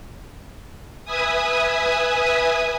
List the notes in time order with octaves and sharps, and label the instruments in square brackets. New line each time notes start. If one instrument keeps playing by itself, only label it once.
[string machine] B4 E5 G#5 D#6